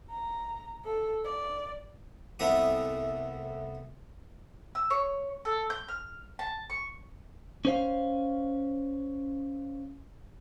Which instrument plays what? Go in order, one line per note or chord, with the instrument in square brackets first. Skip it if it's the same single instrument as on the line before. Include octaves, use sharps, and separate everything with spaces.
[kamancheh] A#5
A4
D5
[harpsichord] C2 A3 B3 E5 D#6
[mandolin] E6
C#5
A4
G6
F6
A5
C#6
[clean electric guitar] C#4 C5 F5